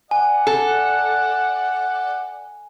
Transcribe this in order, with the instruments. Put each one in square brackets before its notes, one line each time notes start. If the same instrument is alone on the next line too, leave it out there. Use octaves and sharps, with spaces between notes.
[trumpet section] D5 F#5 [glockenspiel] G#5
[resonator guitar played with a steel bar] A4